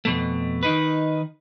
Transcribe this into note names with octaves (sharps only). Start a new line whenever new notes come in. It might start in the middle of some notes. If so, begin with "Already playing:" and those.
F2 B2 A3
D#3 D#4 B4